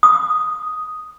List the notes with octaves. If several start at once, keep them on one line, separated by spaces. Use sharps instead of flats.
D#6